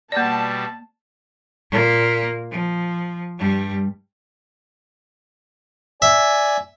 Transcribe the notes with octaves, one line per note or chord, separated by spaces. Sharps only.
B2 G3 A#3 D5 A5
A#2 A#3
F3
G2 G3
D5 E5 G#5